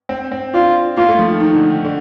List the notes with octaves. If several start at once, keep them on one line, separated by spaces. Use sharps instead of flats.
C4
C4
D4 F4
A#3 F4
A3
F3
D#3
D#3 D#4
D3
D#3
D3